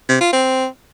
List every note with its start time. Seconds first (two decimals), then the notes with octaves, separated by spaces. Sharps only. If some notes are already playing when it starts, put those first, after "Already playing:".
0.09 C3
0.21 F4
0.33 C4